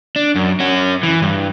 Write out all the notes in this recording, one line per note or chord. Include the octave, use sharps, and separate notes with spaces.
D4
F#2
C#4 F#4
E3
G2